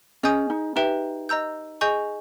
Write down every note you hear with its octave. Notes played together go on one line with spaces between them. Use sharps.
C#4 G#4 D#5 G#5 D#6 G6
D#4
D#4 G4 B4 E5 G5
D#5 A#5 E6 G6
G#4 D#5 G#5 C#6 G6